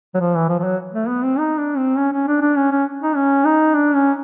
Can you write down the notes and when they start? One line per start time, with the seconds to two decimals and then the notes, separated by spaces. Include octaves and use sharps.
0.14 F#3
0.20 F3
0.35 E3
0.49 F3
0.59 F3
0.64 F#3
0.93 A3
1.08 B3
1.23 C4
1.39 D#4
1.58 D4
1.77 C4
1.98 C#4
2.12 C#4
2.27 D4
2.41 D4
2.57 C#4
2.71 C#4
3.02 D#4
3.16 C#4
3.45 D#4
3.75 D4
3.94 C#4